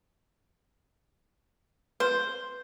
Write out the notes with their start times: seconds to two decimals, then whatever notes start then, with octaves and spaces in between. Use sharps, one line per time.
2.00 B4 C5